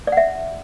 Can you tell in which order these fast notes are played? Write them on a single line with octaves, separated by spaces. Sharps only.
D5 F#5 E5